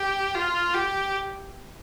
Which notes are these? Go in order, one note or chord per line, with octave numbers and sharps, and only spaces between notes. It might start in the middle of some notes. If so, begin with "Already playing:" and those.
Already playing: G4
F4
G4